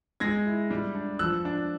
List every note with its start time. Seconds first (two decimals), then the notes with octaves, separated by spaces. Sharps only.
0.20 G#3 G#6 A#6
0.46 E4
0.71 G3
0.95 D4
1.19 F3 E6 F#6
1.45 D4